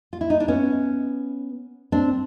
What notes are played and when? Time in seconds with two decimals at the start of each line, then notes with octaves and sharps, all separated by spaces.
0.13 F4
0.21 E4
0.30 D#4
0.40 D4
0.48 B3 C#4
1.92 C4 D4